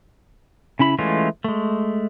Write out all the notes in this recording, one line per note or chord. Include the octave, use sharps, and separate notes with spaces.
C#3 C#4 E4 B5
E3 G#3 A3 C#4 F4
G#3 A3